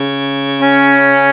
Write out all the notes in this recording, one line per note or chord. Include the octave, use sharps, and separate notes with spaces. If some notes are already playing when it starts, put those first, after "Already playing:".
Already playing: C#3
C#4